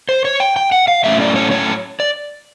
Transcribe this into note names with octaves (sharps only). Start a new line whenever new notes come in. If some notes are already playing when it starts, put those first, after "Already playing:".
C5
C#5
G5
G5
F#5
F5
A2 F#3 A3 C#4 E5
D5
C#5
C#5
D5